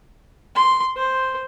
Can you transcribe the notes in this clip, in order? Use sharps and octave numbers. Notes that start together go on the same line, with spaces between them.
C6
C5